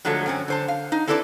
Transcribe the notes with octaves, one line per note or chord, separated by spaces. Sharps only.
D3 F3 F#3 G#3 A3
F#2 C4 C#4
D3 C5 A5
F5
D#4
C4 E4 A4 B4 C#5 D5